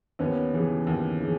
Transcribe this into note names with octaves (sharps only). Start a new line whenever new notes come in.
D#2 B3 C#4
C#3 E3
D#2
C#3 E3